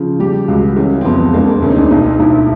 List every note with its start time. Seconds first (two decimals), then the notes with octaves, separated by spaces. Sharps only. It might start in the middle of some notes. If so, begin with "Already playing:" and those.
Already playing: C#3 F3
0.20 G3 G4
0.48 C#2 F#4
0.76 E3 C#4
1.01 C4
1.05 F2 B3
1.34 E1 A#3
1.48 C4
1.62 D2 C#4
1.70 D#4
1.77 D4
1.91 B1 D#4
2.20 B1 E4